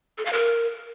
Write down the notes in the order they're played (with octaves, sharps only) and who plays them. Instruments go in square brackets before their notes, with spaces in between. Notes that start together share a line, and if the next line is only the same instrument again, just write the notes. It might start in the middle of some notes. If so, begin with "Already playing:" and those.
[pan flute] A4
F5
A#4